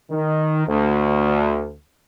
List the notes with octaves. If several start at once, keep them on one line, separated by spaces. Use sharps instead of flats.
D#3
D2